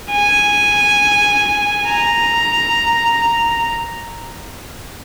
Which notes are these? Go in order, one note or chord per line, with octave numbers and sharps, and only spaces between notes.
G#5
A#5